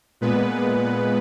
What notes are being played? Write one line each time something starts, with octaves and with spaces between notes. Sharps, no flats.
A#2 G#3 B3 B4